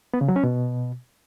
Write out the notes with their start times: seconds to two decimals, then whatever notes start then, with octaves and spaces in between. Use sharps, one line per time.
0.14 B3
0.21 C#3
0.28 F#3
0.36 C#4
0.43 B2